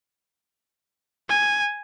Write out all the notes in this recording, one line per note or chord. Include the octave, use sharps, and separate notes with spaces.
G#5